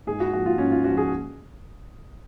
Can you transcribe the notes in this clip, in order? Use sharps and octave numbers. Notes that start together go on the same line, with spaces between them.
G#2 G#4
F#4
F3 F#4
F4
G#2 C#4
F4
F3 F#4
G#4